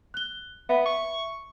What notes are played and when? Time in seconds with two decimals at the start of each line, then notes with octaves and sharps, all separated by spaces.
0.14 F#6 G7
0.69 B3 E5
0.86 C#6